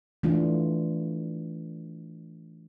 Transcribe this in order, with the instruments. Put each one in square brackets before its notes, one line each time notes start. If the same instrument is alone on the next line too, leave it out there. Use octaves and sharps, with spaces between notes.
[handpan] E3 A3 D4 F4